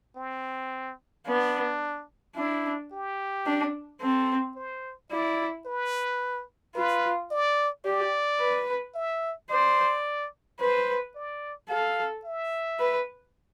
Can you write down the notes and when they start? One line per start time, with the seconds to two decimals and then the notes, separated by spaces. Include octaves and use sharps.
0.16 C4
1.27 B3 D4
2.36 D4 E4
2.92 G4
3.46 D4
4.01 C4 A4
4.56 C5
5.11 E4 D5
5.66 B4
6.75 F4 B4
7.31 D5
7.85 G4 D5
8.40 B4
8.95 E5
9.50 C5 D5
10.59 B4 C5
11.15 D5
11.69 A4 F5
12.24 E5
12.79 B4